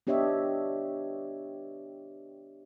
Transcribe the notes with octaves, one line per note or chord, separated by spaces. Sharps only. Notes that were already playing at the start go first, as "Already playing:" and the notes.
B3 D4 G4 C#5 D#5 E5